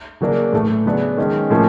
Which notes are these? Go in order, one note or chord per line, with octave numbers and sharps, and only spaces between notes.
C#3 F#3 A#3 D4
A2 E3 A3
C#3 F#3 B3 D4
D#3 G#3 C#4
A2 F3 A#3 C#4